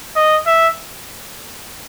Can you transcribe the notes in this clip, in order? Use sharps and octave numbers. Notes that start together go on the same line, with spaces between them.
D#5
E5